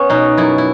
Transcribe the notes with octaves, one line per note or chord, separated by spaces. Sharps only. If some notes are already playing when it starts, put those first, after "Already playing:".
Already playing: B3 C#4
B2 D#4
F#2 E4
E4